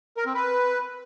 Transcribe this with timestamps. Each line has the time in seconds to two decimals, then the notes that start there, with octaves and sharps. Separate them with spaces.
0.17 A#4
0.26 C4
0.34 B4